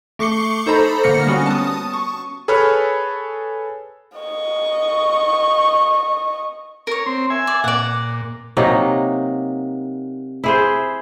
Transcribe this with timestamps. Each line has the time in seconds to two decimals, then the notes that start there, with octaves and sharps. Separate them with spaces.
0.19 A3 C#6 D6 C7 C#7 G7
0.66 D#4 A4 C5 A#5 B5
1.03 D3 A#3 F6 A#6 C#7
1.26 G3 B3 C#4 F#4
1.46 A5 D#6
1.93 C#6
2.48 G#4 A4 B4 C#5 B5 F6
4.18 D#5 C#6
6.87 A#4 C#5
7.06 C4 C6
7.30 E5 G#5
7.47 D5
7.64 A#2 D5 F#5
8.57 C3 F#3 A#3 D#4
10.44 E4 G#4 C5